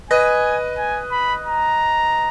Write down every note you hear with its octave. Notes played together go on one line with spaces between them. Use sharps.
B4 D#5 G#5
G#5
B5
A#5